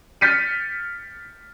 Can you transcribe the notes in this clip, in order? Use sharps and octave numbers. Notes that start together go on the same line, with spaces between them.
F6 G6 A6 B6 C#7 D#7